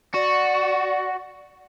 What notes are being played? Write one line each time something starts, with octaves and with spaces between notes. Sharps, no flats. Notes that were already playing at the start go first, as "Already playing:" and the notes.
F#4 D5